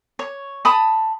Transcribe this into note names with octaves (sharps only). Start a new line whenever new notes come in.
C#5
A5 B5 D#6